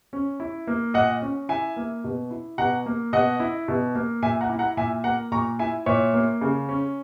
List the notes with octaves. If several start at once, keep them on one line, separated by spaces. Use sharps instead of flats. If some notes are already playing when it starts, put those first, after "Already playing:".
C#4
E4
A#3
A#2 D#5 F#5
C#4
E4 E5 G#5
A#3
B2
E4
B2 F#5 A#5
A#3
B2 D#5 F#5
E4
B2
A#3
A#2 E5 G#5
F#5 A#5
E4
F#5 A#5
A#2 E5 G#5
A#3 F#5 A#5
A#2 A#5 C#6
E4 E5 G#5
A#2 C#5 E5
A#3
C#3
C#4